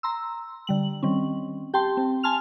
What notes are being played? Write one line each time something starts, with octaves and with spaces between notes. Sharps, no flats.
A#5 C6 E6
D3 G3 F#7
D#3 G3 C4 C#4
G4 G5 A5 C6
C4
G#5 A5 C6 F6 F7